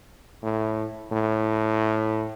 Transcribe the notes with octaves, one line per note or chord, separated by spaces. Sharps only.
A2
A2